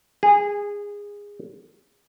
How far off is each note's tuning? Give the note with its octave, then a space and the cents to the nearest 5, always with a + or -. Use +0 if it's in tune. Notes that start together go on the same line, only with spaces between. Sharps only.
G#4 -20